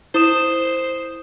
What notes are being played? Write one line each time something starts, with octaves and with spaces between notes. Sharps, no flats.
E4 C5 D#6 E7